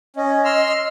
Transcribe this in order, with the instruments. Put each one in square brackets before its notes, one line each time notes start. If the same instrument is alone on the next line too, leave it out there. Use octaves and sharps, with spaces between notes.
[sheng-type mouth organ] C#4 [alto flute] D#5
[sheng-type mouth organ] C6 E6 F6